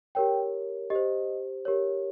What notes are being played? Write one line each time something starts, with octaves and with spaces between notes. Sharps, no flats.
G4 A#4 C#5 G5
G4 D#5
C5
G4 A#4 C#5